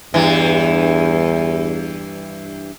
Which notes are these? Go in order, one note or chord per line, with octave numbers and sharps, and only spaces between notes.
E2 G2 E3